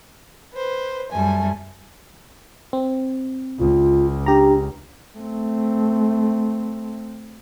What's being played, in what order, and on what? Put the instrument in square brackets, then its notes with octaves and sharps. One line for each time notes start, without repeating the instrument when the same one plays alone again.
[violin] B4 C5
[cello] F#2 G3 [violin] A3 G#5
[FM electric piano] C4
[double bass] C#2 [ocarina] F4
[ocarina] D4 [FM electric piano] G4 A#5
[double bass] A3 C4